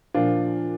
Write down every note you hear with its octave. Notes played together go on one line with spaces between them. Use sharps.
A#2 F3 D4 F4